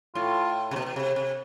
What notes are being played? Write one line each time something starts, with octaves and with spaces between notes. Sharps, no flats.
A2 F4
C3
B2
B2
C3
C3